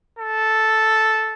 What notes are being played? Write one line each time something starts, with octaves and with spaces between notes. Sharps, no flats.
A4